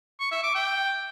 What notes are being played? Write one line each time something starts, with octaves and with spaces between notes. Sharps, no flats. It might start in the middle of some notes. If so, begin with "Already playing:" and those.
C#6
E5
D6
G5